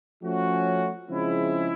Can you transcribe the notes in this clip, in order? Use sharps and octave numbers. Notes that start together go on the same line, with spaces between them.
F3 A3 C#4 F#4
C#3 F3 G#3 C4 E4